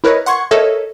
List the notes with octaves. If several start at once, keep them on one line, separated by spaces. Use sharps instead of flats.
E4 A#4 B4 C#5 D#5
F#5 C6 C#6 G#6
A4 A#4 C#5 D#5 E5